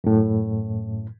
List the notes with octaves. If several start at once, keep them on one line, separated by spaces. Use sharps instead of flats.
F#2 A2